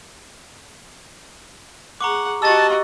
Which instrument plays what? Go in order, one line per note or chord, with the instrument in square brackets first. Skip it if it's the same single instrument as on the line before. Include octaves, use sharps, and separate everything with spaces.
[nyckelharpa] G#4 F#5 [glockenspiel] A#5 C#6 D6
[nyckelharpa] F#4 D#5 [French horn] G4 [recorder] A5 [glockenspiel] E6 A6